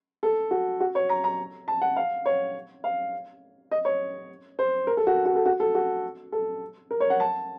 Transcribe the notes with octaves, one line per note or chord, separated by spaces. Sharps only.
A4
F#4
F#4
C#5
A#5
A#5
A5
F#5
F5
C#5
F5
D#5
C#5
C5
A#4
A4
F#4
F#4
A4
F#4
A4
F#4
A4
A#4
C#5
F#5
A5